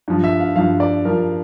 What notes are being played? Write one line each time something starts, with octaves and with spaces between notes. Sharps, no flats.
G2 F3
E5
F5
G2 F3 F5
D5
G2 F3 A#4